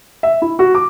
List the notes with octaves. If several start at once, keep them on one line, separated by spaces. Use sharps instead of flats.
E5
E4
F#4
D6